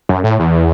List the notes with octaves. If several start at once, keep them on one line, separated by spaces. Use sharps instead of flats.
F#2
A2
E2